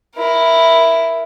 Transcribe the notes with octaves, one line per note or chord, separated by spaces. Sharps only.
E4 A#4